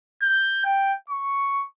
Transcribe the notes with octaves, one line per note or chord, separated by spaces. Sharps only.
G6
G5
C#6